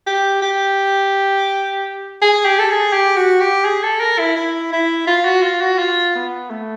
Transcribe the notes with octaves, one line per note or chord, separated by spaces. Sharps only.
G4
G4
G#4
G4
A4
G#4
G4
F#4
G4
G#4
A4
A#4
E4
E4
E4
F4
F#4
F4
F#4
F4
B3
A3